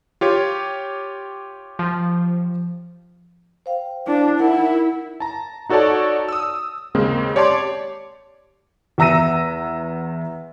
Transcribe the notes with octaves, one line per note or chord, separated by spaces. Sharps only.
F4 G4 C#5
F3
C5 F5 G5
D4 E4
D#4 E4 A#4 F#5
A5 A#5
D#4 F#4 A4 C#5 D5 A5
D#6 E6
D#2 C#3 G#3 A#3 C4
G4 C#5 D5 A5 C6 D6
E2 E5 A#5 E6 A#6 D#7